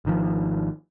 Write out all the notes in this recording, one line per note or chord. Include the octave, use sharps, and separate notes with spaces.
G#1 D#3 F3